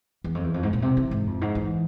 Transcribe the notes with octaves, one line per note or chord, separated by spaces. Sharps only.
E2
F2
E2
F2
G#2
A#2
C3
E3
G#2
F2
G#2
E3